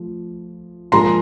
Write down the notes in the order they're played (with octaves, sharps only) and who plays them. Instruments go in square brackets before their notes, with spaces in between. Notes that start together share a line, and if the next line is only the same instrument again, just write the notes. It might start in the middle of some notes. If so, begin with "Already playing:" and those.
Already playing: [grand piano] F3 A3
[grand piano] A#2 F3 G#3 [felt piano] A#5 C6